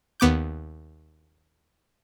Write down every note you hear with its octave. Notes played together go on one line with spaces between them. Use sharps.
D#2 B3 D6 G6